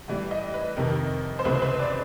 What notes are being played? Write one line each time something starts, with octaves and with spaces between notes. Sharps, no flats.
A2 E3 G3
D#5
B4
F2 C3 D#3 A#4
C5
C#2 C3 E3 A3 B4
C5
B4
D5